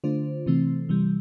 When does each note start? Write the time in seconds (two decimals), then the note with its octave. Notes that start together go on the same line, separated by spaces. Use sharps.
0.04 D3 A3 D4 F4 C5
0.46 C3 E3 A3 C4
0.89 C3 E3 G3